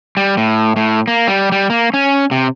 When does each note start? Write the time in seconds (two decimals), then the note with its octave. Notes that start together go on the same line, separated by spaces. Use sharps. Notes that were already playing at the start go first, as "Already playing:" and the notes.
0.17 G3
0.37 A2
0.76 A2
1.08 A#3
1.28 G3
1.52 G3
1.70 A#3
1.94 C#4
2.31 C3